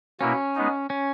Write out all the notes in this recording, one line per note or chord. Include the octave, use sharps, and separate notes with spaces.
B2 A#3 C#4 E4
G#3 B3 D#4
C#4